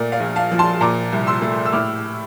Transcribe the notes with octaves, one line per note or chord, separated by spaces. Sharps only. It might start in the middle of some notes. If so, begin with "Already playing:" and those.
Already playing: A#2 A3 A#4 D5
D5 F5
A#1
F5 A5
F3
A5 C6
A#2 A#5 D6
C2
C6 E6
A3
E6
A2 D6 F6